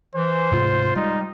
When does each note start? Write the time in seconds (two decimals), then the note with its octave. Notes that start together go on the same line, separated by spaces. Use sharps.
0.15 E3 C5
0.51 D2 G#2 C3 F4
0.96 G3 G#3 D#4